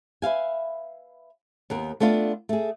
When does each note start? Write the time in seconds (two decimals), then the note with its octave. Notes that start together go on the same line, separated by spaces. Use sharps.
0.22 B4 E5 F5 G#5
1.70 D#2 B3 A#4
2.00 A3 B3 D4 F4 F5
2.49 A3 G#4